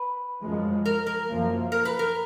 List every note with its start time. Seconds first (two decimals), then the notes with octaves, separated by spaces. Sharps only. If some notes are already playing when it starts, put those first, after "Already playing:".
Already playing: B4
0.42 F#2 F3 G#3
0.85 A#4
1.06 A#4
1.29 F#2 F3 A#3
1.72 A#4
1.85 B4
1.99 A#4